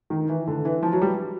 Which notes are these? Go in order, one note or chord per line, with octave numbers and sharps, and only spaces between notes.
D#3
E3
D3
E3
F3
F#3
G3